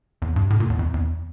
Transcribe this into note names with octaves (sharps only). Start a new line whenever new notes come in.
E2
G2
A2
A#2
E2
F2
E2